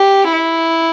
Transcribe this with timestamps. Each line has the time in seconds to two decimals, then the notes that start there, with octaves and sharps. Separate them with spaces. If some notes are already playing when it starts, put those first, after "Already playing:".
Already playing: G4
0.32 E4